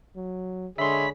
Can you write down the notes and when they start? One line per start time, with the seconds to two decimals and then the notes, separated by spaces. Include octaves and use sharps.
0.16 F#3
0.78 D3 G#3 G#4 C#5 E5 B5 C6